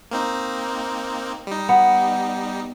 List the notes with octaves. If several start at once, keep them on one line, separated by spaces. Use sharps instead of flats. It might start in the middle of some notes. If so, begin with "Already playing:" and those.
A#3 C4 D#4
G3 D#4
B3